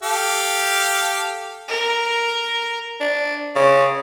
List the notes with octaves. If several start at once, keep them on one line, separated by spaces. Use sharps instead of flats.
G4 A4 F5
A#4
D4
C#3